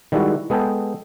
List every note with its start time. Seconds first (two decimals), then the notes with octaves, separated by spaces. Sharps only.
0.12 D#3 G3 G#3 E4 F#4
0.50 G#3 B3 G#4 A4 G5